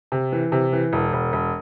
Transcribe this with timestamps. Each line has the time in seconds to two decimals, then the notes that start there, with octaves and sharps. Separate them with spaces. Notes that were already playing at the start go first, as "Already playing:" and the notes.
0.12 C3
0.32 E3
0.52 C3
0.73 E3
0.93 E1
1.13 E1
1.33 E1